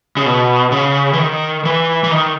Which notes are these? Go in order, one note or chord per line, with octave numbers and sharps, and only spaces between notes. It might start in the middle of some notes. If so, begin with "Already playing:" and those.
C#3
B2
C#3
E3
D#3
E3
E3
D#3